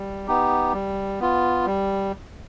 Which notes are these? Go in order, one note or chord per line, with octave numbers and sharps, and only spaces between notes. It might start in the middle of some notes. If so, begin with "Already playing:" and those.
Already playing: G3
B3 D#4 G4
G3
B3 F4
G3